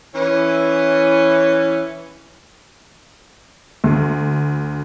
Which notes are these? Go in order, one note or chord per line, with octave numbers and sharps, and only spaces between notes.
E3 C#4
D2